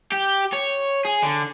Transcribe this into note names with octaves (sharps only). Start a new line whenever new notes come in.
G4
C#5
G#4
D3